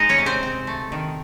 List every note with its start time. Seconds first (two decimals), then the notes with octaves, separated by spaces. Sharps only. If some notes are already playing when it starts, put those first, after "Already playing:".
Already playing: G#3 D#4 D#5
0.09 C#4 C#5
0.18 C3
0.26 C4 C5
0.43 C4
0.67 A3
0.92 D#3